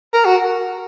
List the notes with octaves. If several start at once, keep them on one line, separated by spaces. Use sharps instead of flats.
A#4
F#4